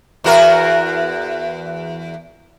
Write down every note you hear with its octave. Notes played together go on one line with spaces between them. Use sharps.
E2 F#4 A#4